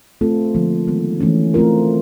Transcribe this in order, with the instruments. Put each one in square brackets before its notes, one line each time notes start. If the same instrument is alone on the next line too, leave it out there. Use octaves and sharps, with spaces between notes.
[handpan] A3 C4 F4 A4
D3 F3 A#3
D#3 G#3 B3
E3 A3 C#4
A3 C4 F4 A#4